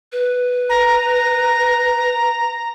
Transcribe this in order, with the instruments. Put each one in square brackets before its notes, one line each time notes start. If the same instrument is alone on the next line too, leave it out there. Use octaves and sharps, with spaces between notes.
[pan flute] B4
[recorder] A#5